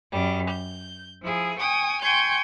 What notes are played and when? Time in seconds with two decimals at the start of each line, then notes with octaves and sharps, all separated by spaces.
0.12 F#2 G3
0.50 G6
1.23 F3 E4 G#4
1.60 G5 G#5 C#6 D#6
2.02 G5 G#5 C6 C#6 G6 G#6